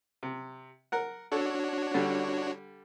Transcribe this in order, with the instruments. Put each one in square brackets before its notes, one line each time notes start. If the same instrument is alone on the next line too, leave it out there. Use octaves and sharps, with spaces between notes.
[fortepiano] C3
A#4 F#5
[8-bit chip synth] D4 F#4 C#5 [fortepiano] A4
[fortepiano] D3 G3